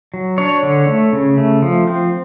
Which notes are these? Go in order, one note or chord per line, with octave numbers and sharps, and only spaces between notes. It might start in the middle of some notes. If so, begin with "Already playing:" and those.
F#3
D4 C#5
D3
A3
C#3
A3
F3
C4